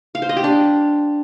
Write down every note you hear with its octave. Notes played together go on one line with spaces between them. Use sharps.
F5
C5
D#5
G4
D4